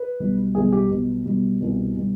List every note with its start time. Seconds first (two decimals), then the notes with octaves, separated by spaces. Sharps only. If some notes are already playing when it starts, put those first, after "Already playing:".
Already playing: B4
0.20 B1 B2 G3
0.55 B1 B2 G3 G#4
0.72 G4
0.91 B1 B2 G3
1.26 B1 B2 G3
1.61 C2 B2 G3
1.96 B2 G3